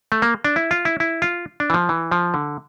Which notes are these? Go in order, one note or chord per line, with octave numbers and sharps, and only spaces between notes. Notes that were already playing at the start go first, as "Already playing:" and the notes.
A3
A#3
D4
E4
F4
E4
E4
F4
D4
E3
F3
E3
F3
D3